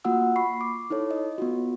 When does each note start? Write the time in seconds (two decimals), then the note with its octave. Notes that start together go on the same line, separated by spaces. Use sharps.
0.05 A#3 F4 F#4 F#5 E6
0.36 B5 C#6 C7
0.61 D6
0.90 D#4 E4 A4 C#5
1.11 D#5
1.38 B3 F4 F#4